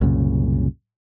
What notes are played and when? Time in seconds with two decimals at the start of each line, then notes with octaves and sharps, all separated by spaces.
0.01 C2 F#2 A#2 C#3